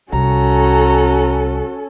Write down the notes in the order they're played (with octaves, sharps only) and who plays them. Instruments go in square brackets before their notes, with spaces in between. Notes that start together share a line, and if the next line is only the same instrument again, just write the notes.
[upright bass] C2 [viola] C#4 A4 [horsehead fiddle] F#4 [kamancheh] A#5